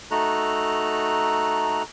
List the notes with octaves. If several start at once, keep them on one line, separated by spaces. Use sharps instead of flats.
A3 D#4 F#4 A4 A#5 F#6